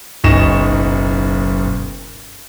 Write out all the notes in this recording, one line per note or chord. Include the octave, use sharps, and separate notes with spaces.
F#1 B1 D#4 C#6 A#6 E7